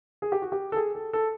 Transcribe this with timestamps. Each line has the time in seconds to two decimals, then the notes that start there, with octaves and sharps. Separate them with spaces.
0.22 G#4
0.32 G4
0.42 F#4
0.52 G4
0.72 A4
0.76 G#4
0.95 A4
1.13 A4